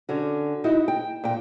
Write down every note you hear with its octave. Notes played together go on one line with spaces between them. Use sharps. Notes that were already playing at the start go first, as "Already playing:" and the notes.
D3 C#4 F#4
D#4 E4 F#4
G5
A#2 G5